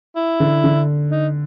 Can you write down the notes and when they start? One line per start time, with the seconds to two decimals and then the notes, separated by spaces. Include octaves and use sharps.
0.16 E4
0.40 D3
0.64 D3
1.11 D#4